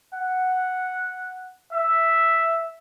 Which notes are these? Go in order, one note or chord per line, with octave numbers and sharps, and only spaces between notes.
F#5
E5